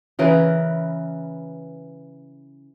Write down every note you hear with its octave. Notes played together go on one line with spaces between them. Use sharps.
C#3 E3 A#4 B4